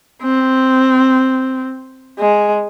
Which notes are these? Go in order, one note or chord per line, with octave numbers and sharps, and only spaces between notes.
C4
G#3